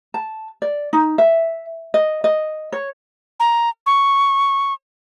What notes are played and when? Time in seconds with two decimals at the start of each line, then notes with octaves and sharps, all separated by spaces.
0.14 A5
0.62 D5
0.93 D#4
1.18 E5
1.94 D#5
2.24 D#5
2.72 C#5
3.40 A#5
3.86 C#6